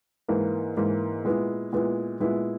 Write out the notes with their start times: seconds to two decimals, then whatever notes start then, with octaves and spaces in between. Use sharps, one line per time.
0.28 G#2 E3 A#3
0.77 G#2 E3 A#3
1.25 A#2 G#3 B3 E4
1.73 A#2 G#3 B3 E4
2.20 A#2 G#3 B3 E4